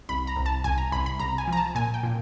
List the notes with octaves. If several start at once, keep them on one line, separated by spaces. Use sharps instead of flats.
C2 B5
A#5
C2
A5
C2 G#5
A#5
C2 B5
B5
C2 A#5
G#5
F3 A#5
A5
A#2 G#5
G5
A#2